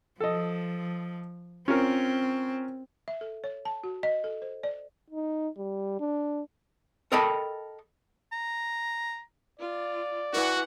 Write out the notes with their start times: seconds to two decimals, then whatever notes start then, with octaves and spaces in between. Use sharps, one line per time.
0.20 F3 A4 D#5
1.68 C4 C#4 F4 A#4
3.08 E5
3.21 A4
3.44 C#5
3.65 A5
3.84 F#4
4.03 D#5
4.24 A4
4.42 C5
4.63 D5
5.10 D#4
5.57 G3
6.00 D4
7.12 A4 A#4 D#5 G5 A5 B5
8.32 A#5
9.60 F4 D5
10.33 E3 F#4 F#5